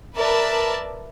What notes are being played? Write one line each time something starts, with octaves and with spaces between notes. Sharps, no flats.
A#4 B4 D5 E5 A5